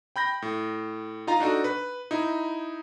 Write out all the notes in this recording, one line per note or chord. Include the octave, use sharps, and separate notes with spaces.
G5 B5 G6 A#6
A2
D#4 F4 F5 A#5
D4 D#4 F#4 A4
B4
D#4 E4